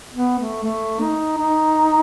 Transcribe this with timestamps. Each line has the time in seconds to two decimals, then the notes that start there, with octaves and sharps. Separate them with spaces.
0.14 B3
0.39 A3
0.64 A3
1.01 D#4
1.38 D#4